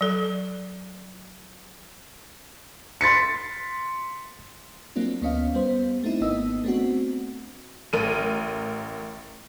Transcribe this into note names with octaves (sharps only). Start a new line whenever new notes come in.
F#3 A4
C6 A6 B6 C#7
F#3 A#3 C4 D4 F4
D2 B3 C#4 D#5 F5
G3 B3 C5
A3 C4 D#4 E4
G#1 A#3 B3 D#4 D#5 E6
A3 B3 C4 D4 F#4
A1 A#4 D#7